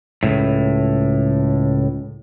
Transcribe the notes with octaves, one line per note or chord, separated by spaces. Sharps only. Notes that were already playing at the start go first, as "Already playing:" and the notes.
C#2 A2